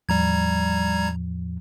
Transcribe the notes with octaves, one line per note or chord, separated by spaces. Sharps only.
E2 A2 F3 G3 A#5 G#6